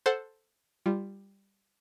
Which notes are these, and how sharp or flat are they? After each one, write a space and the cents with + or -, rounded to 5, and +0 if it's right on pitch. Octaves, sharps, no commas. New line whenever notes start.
A4 +0 C5 +5 F#5 +0
G3 +10 F4 -15